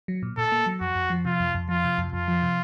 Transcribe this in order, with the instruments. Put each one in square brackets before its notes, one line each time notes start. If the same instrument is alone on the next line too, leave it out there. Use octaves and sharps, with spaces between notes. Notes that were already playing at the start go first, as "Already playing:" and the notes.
[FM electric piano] F#3
A#2
[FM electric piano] A#2 [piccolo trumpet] A4
[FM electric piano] A#3
F#3
[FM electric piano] F2 [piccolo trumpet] F#4
[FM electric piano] F2
F3
[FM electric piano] C3 [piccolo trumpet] F4
[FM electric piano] F2
F2
[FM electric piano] F3 [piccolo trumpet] F4
[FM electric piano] C3
F2
[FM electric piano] F2 [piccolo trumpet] F4
[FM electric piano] F3
C3